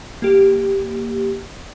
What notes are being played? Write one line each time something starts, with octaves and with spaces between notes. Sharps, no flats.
A#3 G4